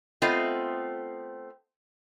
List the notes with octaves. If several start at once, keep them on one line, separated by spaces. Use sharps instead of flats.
A3 B3 C4 F4 D#5